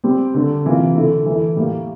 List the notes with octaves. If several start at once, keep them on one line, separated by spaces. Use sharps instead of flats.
G3 C4 G4
D3 A3 D4
C3 E3 A#3 F4
D3 A3 E4 A4
E3 A3 E4
A2 G3 A#3